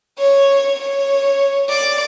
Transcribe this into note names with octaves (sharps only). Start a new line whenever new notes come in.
C#5
C#5
D5